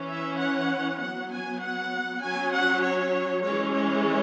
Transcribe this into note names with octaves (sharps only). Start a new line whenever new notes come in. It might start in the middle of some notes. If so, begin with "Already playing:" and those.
Already playing: E3 C#4
E5
F#5
F#3 B3 F#5
G#5
F#5
F#3 C#4 G#5
F#5
C#5
E3 G#3 C#4 C#5
C#5